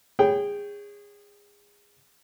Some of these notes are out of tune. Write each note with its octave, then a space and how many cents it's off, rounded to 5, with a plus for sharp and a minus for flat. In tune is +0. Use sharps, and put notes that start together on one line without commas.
G#4 -25 C#5 +5 G5 -5